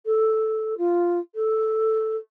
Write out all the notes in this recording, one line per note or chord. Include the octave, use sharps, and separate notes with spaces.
A4
F4
A4